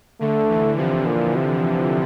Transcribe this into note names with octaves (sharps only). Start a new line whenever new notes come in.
D3 A3
E3
C3 F3
A#2
C3